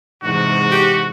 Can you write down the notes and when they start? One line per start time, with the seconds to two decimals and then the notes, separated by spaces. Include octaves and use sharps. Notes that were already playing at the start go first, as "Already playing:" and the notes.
0.24 E2 G#2 C3 F#4
0.71 G4